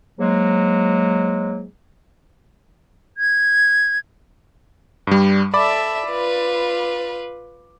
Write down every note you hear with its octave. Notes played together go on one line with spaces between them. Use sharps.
G#2 F#3 G#3 A#3
G#6
G2 G3
A4 D5 E5 B5 D6
F4 B4